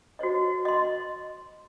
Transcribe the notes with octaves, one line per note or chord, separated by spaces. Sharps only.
F#4 C5 C#5 D#5
D#5 C6